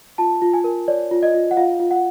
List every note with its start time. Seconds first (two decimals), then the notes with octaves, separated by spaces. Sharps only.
0.18 F4 A5
0.42 F4
0.54 G#5
0.64 A#4
0.88 C#5 D5
1.11 F4
1.23 D#5
1.34 F4
1.51 F#5
1.57 F4 F5
1.80 F4
1.91 F#5